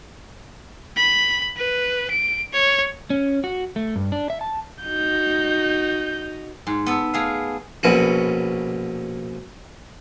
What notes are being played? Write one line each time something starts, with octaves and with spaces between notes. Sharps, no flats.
B5
B4
D7
C#5
C#4
F#4
A3
G2
D4
E5
A5
D#4 F#4 G6
G#2
B3 A4
A3 G#4 F5
A#1 B2 C#4 F#4